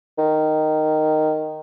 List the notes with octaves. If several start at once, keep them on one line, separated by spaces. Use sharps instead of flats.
D#3